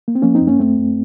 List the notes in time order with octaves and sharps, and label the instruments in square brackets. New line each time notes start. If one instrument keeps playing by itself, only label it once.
[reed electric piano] A#3
C4
F3 A#3 C#4
C4 D#4
F#2
A#3 C#4
F#2 A3 C4
F#2